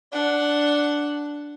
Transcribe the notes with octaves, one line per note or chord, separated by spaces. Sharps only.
D4 F#5